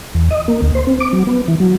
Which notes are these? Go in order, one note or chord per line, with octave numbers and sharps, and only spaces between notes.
E2
D#5
A#3
D2
C5
C4
D6
F#3
B3
E3
F#3